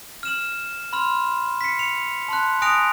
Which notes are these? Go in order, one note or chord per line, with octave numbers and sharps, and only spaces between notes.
F6 E7 F#7
B5 C6 F6
B6 C#7
C#7 F7
A5 C6 F#6
G#5 D#6 F#6 A#6 D7 F7